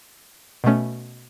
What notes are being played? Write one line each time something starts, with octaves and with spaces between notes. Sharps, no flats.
B2 A3 C#4